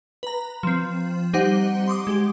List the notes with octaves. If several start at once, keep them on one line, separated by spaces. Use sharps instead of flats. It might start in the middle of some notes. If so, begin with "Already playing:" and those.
B4 A#5
F3 C4
G3 D#4 G4 C5 F#5
C6 D6 D#6
G#3 G4